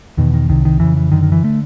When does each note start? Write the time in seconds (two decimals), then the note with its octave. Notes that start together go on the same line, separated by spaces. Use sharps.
0.17 E2 B2 D#3
0.34 D#3
0.49 C2 C3 D#3
0.65 D#3
0.80 F2 C#3 E3
0.96 E3
1.12 F#2 D3 D#3
1.23 D#3
1.32 E3
1.44 D3 A3